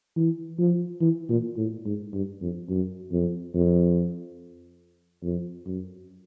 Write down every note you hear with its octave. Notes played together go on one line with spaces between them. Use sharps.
E3
F3
E3
A#2
A2
G#2
G2
F2
F#2
F2
F2
F2
F#2